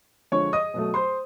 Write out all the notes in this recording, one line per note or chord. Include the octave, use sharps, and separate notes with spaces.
D3 F3 G#3 C#5 C#6
D#5 D#6
B2 F#3 A3
C5 C6